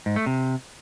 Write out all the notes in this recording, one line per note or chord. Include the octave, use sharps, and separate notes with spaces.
G#2
A3
C3